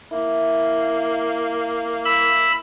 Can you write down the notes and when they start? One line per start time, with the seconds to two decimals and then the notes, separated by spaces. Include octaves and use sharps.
0.11 A#3 E4
2.05 B5 E6